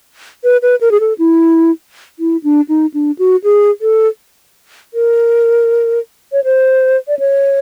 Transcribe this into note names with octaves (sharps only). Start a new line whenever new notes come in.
B4
B4
A#4
G#4
A4
E4
E4
D4
D#4
D4
F#4
G#4
A4
A#4
C#5
C5
D5
C#5